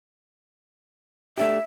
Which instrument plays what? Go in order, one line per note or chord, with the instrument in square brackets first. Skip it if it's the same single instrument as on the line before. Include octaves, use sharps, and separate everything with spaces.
[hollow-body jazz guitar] A3 D4 G4 [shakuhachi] E5